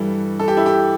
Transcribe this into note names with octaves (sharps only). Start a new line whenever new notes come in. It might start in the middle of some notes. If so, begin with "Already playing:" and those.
Already playing: G2 E3 G3 A4
A4
G4
E4
G4